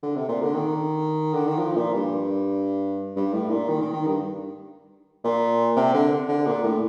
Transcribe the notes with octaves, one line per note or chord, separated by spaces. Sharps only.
D3
C3
A#2
D3
D#3
D3
D#3
F3
A#2
G2
G2
A2
A#2
D#3
D#3
D#3
G2
A#2
C3
D3
D3
A#2
A2